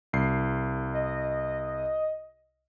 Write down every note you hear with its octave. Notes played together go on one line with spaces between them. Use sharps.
C2 C7
D#5